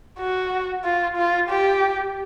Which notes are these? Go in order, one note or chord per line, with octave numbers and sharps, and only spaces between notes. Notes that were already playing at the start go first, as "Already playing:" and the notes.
F#4
F4
F4
G4